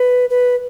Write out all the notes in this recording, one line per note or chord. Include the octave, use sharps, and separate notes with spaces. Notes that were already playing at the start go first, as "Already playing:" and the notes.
Already playing: B4
B4